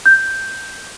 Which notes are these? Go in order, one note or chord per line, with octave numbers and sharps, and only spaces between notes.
G6